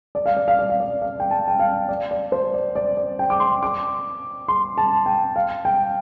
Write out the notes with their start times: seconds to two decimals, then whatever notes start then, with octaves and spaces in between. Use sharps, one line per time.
0.15 D5
0.26 F5
0.37 D5
0.48 F5
0.59 D5
0.70 F5
0.80 D5
1.02 F5
1.20 G5
1.31 A5
1.48 G5
1.59 F5
1.89 D5
2.11 D5
2.32 C5
2.54 D5
2.75 D5
2.97 D5
3.19 G5
3.30 D6
3.40 C6
3.63 D6
4.48 C6
4.78 A5
5.06 G5
5.36 F5
5.65 G5